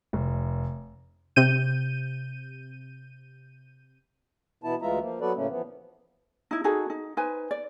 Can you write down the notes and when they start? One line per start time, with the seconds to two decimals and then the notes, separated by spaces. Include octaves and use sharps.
0.13 F1
1.36 C3 G6 D#7
4.64 B2 E3 B3 E4 A5
4.82 D2 E3 G#3 F4 E5 A#5
5.01 F3 A#3
5.21 F#3 B3 F#4 A4 B4 D5
5.36 A2 C#3 A3 A#3 C#4
5.50 E3 F3 B3
6.51 D#4 E4
6.64 D#4 F#4 G#4 A4
6.90 D#4
7.17 D#4 B4 C5 G#5
7.51 D5